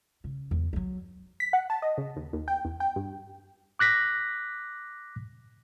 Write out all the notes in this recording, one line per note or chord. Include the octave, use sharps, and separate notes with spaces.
C#3
E2 F#3
F3 F#3
B6
F#5
A5
D#5
C#3
D#2
D#2
G5
E2
G5
G2
D6 F#6 A#6 B6